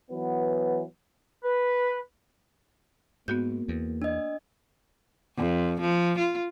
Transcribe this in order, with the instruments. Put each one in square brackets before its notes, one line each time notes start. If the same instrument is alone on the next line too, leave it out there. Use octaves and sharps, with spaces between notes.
[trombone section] E3 F#3 B3
[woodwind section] B4
[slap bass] G#2 [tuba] A#3 [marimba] B3 F#4 G6
[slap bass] E2
[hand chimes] D4 D#5
[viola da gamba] F2
F3
F4